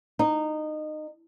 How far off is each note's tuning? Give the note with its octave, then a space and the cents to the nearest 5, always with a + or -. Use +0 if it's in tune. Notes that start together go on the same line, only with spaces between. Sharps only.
D#4 -20